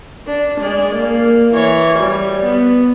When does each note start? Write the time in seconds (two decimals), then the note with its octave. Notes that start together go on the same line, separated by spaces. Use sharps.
0.28 D4
0.61 G#3 D5
0.95 A#3
1.54 E3 C#5
1.99 G3
2.46 B3